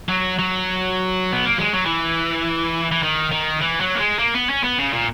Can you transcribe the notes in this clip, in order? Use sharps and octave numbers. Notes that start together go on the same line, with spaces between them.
F#3
F#3
B3
A#3
G#3
F#3
E3
E3
D#3
D#3
E3
F#3
A#3
G#3
A#3
B3
C#4
B3
C#3
A#2